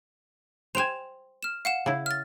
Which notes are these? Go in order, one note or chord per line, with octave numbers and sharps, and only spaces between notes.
C5 G5 G#5 E7 F7
F6 E7
F5 F#5 E7
C#3 E4
F6 A6